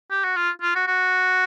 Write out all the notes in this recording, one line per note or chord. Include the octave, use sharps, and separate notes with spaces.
G4
F#4
F4
F4
F#4
F#4